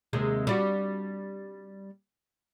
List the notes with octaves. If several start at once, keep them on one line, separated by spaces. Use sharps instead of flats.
D#2 C3 G#3
G3 D4 F#4